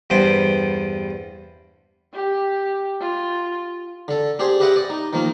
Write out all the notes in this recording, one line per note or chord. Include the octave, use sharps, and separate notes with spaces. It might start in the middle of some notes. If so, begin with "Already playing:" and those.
E2 G2 B3 C5 G5
G4
F4
D3 A4
D4 G4 G#4 C5
G4 B4 D#5 E5 F#5 G5
D5 D#5
D#4
D#3 F3 A#3